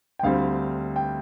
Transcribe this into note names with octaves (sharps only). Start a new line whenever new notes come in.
G5
D2 D3 G3 C4 F5
G5